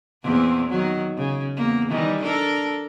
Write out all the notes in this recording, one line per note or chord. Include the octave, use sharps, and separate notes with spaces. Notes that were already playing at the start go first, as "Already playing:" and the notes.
E2 A#2 C4
D#3 F#3
C#3
E2 A#3
D#3 E3 G3
D4 A4 A#4